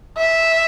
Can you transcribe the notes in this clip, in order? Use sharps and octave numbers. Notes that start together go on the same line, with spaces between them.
E5